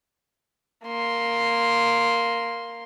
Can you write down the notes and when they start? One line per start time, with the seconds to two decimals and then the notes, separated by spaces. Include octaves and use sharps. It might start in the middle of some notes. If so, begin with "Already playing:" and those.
0.85 A#3 C6